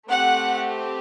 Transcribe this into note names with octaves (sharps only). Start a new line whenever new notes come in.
A3 C4 G4 F#5